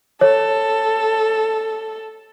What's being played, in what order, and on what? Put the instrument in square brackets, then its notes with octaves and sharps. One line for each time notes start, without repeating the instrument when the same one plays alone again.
[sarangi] A4 [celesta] C#5